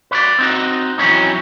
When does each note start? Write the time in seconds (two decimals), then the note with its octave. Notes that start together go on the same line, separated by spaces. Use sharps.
0.11 B4 C#5 D5
0.39 C4 D#4 F#4
0.98 E3 F#3 G3 C4 C#4 D#4